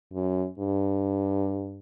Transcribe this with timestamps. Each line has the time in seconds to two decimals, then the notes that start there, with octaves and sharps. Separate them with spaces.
0.14 F#2
0.59 G2